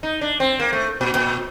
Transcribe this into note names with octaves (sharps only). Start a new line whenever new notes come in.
D#4
D4
C4
A#3
A3
A#2
A#2